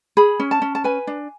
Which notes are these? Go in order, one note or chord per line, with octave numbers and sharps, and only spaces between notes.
G#4 B5
C#4
A5
C#4
A5
B4 G#5
D4